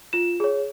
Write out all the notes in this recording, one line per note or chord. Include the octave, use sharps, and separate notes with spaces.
F4 E7
G#4 C#5